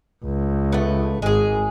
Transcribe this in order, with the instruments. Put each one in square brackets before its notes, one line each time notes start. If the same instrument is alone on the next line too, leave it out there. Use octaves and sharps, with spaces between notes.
[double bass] C#2
[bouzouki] A3 B3
[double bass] G#1 [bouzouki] G#3 G#4